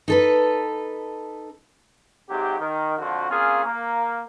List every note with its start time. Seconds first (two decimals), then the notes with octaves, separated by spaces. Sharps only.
0.08 D#4 A4 B4
2.29 G#2 C3 F#3 G4
2.59 D#3
2.99 F2 D3 F3 F#4
3.31 A#3 C4 C#4 F4 G#4
3.65 A#3